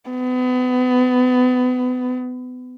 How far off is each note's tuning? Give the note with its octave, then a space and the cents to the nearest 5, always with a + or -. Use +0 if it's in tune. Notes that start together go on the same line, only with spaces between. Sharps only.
B3 +30